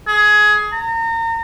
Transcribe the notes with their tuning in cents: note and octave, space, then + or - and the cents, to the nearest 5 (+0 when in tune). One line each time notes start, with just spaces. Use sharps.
G#4 +15
A#5 -35